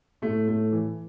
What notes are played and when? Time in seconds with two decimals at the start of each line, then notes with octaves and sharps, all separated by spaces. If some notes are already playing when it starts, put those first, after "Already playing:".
0.22 A2 A3
0.48 A3
0.72 E3